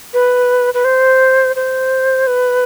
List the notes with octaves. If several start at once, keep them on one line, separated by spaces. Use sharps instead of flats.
B4
B4
C5
C5
B4